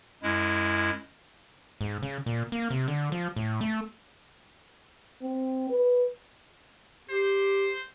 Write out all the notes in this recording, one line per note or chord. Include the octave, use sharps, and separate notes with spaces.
F#2 G#3 E4
G#2
C#3
A#2
A#3
C3
D3
F3
A2
A3
C4
B4
G4 C5